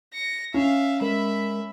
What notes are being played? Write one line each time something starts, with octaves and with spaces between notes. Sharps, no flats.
A#6 C#7
C#4 E5 F5
G#3 A#4 E5 B5